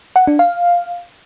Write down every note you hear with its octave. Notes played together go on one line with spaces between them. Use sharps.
F#5
D4
F5